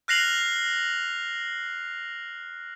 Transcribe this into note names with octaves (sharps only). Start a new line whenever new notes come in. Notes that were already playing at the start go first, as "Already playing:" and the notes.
F6 F#6 A#6 C7 F7 F#7